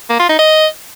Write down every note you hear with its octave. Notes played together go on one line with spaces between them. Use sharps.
A#3
F4
D#4
D#5